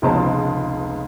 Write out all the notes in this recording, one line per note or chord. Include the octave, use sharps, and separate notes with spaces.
F1 C#2 G#3 B3 C5 A5